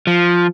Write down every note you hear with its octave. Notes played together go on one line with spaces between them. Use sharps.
F3